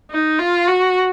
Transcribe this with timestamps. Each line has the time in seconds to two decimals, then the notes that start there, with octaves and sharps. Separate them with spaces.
0.10 D#4
0.39 F4
0.67 F#4